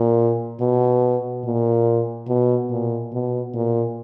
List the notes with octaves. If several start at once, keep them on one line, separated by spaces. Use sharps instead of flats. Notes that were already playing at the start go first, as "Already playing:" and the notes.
Already playing: A#2
B2
A#2
B2
A#2
B2
A#2